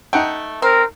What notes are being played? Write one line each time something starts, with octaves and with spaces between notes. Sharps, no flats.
A3 D#4 F#5 G5
C4 A#4